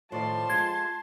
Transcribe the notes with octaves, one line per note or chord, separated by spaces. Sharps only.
A2 D#3 F3 D5 A5 C6
G#3 F4 G#6